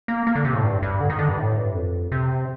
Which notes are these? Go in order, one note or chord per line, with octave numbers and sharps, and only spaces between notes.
A#3
A#3
D3
C3
A2
G2
G2
D3
D#3
D3
G2
A2
G2
F2
C3